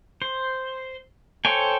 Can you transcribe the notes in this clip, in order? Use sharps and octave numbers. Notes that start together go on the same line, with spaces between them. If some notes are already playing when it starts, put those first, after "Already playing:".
C5
A4 C5 C#5 G5 G#5